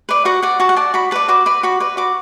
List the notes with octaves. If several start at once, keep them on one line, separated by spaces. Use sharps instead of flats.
B4 D5
F#4 F#5
D5 F#5
F#4 A5
F#5
D5 A5
F#4 B5
B4 D5 A5
F#4 D6
B4 D5 B5
F#4 B5
B4 D5
F#4 D6